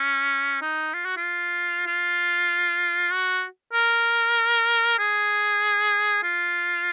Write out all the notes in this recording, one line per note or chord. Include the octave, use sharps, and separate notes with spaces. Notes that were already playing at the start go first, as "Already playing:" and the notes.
Already playing: C#4
D#4
F4
F#4
F4
F4
F#4
A#4
G#4
F4